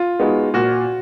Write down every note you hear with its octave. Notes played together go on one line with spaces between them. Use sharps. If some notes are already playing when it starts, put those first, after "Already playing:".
Already playing: F4
G#3 B3 D#4 F#4
A#2 F#4